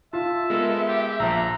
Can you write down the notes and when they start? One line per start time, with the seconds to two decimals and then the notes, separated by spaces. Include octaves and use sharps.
0.13 F4 E5 A5
0.50 G#3 B3 A4 A#4
0.88 G4
1.20 A#1 F3 A#5